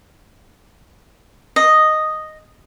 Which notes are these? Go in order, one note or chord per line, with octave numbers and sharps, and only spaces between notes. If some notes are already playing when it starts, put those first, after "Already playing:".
D#5